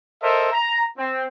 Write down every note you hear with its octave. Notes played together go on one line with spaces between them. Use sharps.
A4 A#4 C5 D#5 E5
A#5
C4